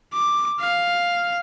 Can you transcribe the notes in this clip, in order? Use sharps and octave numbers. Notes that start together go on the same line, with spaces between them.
D6
F5